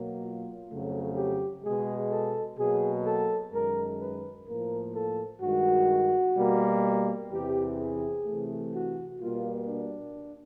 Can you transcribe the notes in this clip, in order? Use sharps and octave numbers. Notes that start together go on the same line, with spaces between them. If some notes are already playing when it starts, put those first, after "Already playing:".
Already playing: B2 F#3 A#3
F4
F2 C#3 F#3 A3
G4
B2 G#3 G#4
A4
B2 F#3 A#3 G#4
A4
F#2 D#3 G#3 A#4
B4
A2 F3 A#3 A#4
A4
G2 D#3 G#3 F#4
B2 G3 A#3
E2 C3 E3 G4
G#4
C3 E3 A3
F#4
B2 G3 A#3 F4
D4